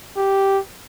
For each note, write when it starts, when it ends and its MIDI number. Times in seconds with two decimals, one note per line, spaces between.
0.17 0.59 67